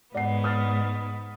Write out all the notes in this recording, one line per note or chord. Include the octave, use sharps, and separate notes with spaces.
G#2 B3 D5 F#5 C7
D#6 F6 A6